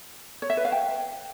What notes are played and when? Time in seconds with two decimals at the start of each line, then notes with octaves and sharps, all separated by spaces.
0.42 C#5
0.50 E5
0.57 B4
0.65 F5
0.72 G5